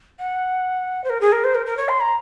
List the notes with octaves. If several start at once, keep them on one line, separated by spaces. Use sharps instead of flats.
F#5
C5
A#4
G#4
A#4
C5
A#4
A#4
C#5
C6
A#5